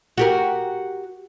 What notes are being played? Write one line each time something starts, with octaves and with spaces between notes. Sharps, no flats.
F#4 G4 A#4